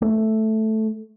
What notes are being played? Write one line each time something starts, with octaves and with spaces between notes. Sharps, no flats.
A3